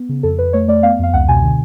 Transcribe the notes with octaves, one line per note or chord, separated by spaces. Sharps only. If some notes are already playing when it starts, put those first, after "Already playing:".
Already playing: B3
C#3
F2 A4
F2 B4
A3 C#5
A3 D5
B3 F5
F2 F5
C#2 F#5
B2 G#5
D3